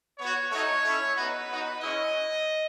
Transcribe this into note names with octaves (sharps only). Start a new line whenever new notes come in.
B3 F#4 C#5
A3 D#4 F#4 C#5
A3 C#4 E4
B3 D#4 F#4 B4
B3 D#4 F#4
G#3 C#4 E4 D#5